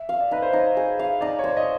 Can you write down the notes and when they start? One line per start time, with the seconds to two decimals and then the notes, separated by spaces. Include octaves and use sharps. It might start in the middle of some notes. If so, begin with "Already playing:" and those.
Already playing: E5
0.09 F5
0.20 D5
0.31 D#4 B4
0.42 C5
0.53 D#4 C#5
0.77 G#4
0.99 F5
1.21 D#4 D5
1.39 C#5
1.44 C5 D5
1.57 D#5